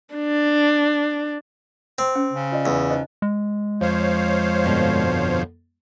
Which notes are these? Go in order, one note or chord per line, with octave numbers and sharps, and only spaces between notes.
D4
C4
C#4 G5
C#3
F4 D5 D#5
E2
D#4 C5 D#5
G#3
F2 C5 C#5 F5
G2 B2 D3